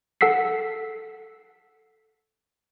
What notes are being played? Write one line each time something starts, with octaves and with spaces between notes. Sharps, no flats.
A4 F#5 E6 B6 C7